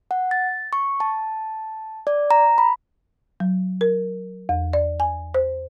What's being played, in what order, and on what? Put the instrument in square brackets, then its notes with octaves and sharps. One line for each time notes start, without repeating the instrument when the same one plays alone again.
[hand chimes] F#5
A6
C#6
A5
D5
A#5
B5
[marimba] F#3
A#4
E2
D5
G#5
C5